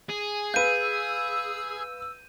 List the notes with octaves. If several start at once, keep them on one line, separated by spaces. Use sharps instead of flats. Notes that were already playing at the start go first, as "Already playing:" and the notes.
G#4
B4 F5 E6 G6 D#7